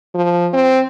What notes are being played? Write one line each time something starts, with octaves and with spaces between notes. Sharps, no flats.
F3
C4